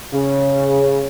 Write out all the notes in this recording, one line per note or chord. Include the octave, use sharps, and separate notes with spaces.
C#3